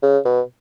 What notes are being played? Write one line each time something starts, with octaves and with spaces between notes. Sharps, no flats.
C#3
B2